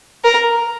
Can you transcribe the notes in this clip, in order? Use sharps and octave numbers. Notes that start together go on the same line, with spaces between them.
A#4